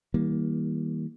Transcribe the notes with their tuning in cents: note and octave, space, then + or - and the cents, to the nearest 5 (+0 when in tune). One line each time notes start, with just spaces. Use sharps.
D#3 +45 G3 +0 A#3 +15